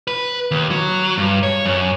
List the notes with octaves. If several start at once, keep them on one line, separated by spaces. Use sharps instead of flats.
B4
D#2
F#3
G2
C#5
F#2